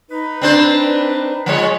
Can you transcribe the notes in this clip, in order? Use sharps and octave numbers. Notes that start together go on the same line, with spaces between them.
D#4 B4
C4 D4 C5
F3 G#3 C#5